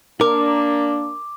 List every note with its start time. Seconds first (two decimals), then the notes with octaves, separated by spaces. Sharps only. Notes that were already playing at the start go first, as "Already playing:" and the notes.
0.21 A#3 D4 A#4 D6